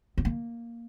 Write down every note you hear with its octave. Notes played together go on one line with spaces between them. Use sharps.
B3
A#3